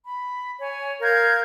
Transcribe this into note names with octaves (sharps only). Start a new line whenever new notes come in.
B5
C#5 G#5
A#4 F5 G6 G#6